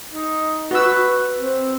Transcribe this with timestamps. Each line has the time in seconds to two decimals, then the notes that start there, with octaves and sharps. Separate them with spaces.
0.13 D#4
0.71 F#4 B4 E6
1.37 C4